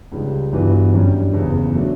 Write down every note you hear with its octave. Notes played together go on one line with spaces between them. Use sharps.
C#2 C#3 G3
G1 G2 E3 B3 F#4
F#2 D3 G3 C#4 G4
F#1 E2 C#3
F#3 A3 D4